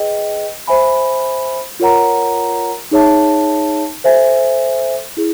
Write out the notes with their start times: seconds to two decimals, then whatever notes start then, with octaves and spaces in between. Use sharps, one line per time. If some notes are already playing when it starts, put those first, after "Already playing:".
Already playing: G#4 B4 D#5 G5
0.67 C5 E5 G#5 B5
1.80 F4 A#4 C#5 F#5 A#5
2.91 D#4 G#4 C#5 E5 A5
4.04 A4 C5 E5 G#5
5.17 E4 G#4